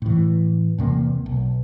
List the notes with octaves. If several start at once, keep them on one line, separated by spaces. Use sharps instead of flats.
A2 E3
E2 C3 A#3
B1